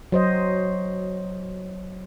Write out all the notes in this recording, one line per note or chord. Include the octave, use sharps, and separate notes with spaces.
F#3 C5 D#5